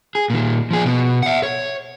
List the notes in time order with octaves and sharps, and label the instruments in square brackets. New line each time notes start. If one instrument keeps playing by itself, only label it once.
[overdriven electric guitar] G#4
A#2 D#3
F3 G#4
B2
E5 F#5
C#5